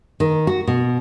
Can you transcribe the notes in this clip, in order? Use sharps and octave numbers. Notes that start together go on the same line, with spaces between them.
D#3
F#4
B2